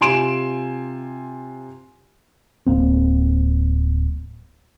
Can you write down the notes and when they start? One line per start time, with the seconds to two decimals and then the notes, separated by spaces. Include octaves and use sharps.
0.01 C3 F4 G#5 C6 D7 E7
2.67 D1 G2 A#3 C4